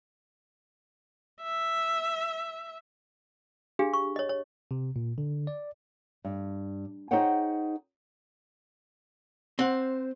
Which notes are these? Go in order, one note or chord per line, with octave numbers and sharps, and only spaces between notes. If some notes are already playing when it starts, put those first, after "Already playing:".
E5
D4 G4 G#4 F5
C#6
C#5 D#5
C#5
C3
A#2
D3
D5
G2
D#4 G#4 C5 C#5 F#5 G5
C4 C5 F#5